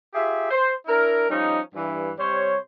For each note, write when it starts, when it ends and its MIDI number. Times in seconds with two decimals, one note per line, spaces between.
0.14 0.48 65
0.14 0.48 67
0.14 0.48 68
0.14 0.48 76
0.51 0.73 72
0.87 1.29 62
0.87 1.29 64
0.87 1.29 70
1.29 1.60 53
1.29 1.60 55
1.29 1.60 61
1.29 1.60 63
1.75 2.12 43
1.75 2.12 52
2.18 2.57 48
2.18 2.57 55
2.18 2.57 72
2.18 2.57 73